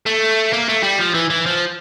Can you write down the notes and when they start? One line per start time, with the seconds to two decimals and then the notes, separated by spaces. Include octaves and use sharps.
0.06 A3
0.53 A#3
0.69 A3
0.83 G3
0.99 F3
1.14 E3
1.30 E3
1.46 F3